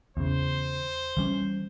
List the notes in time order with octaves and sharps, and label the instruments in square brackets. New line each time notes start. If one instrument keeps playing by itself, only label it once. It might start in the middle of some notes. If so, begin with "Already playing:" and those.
[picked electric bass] E2 C#3 [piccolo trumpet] C5
[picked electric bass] E3 G3 C#4